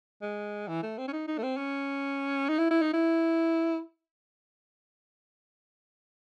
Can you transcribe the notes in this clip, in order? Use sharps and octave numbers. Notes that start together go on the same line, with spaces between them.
G#3
E3
A3
C4
C#4
D#4
D#4
A3
C4
C#4
D#4
E4
E4
D#4
E4